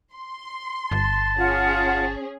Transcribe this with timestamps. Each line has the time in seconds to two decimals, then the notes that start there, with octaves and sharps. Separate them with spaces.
0.14 C6
0.91 G1 A5
1.38 C#4 F4 G#4 F#5